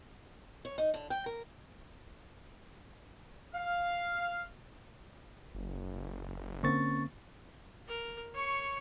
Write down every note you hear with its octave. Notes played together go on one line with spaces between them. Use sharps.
C#5
D#4
D3
G5
A#4
F5
F#1
D3 A#3 C4 C#4 C#6 A6
A#4
C#5 C#6